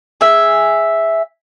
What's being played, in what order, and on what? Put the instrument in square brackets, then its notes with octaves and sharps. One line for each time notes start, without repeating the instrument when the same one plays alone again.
[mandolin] G#4 E5